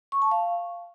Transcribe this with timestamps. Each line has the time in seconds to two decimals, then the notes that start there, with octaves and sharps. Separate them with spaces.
0.12 C#6
0.22 A5
0.31 F5